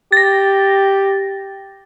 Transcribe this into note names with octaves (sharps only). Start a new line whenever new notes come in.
G4 A6 A#6